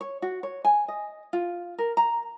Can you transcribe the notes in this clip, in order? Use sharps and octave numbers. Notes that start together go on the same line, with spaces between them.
C#5
F#4
C#5
G#5
D#5
F4
A#4
A#5